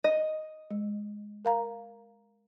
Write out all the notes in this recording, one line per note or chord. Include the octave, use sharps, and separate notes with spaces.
D#5
G#3
A#4 F5 A#5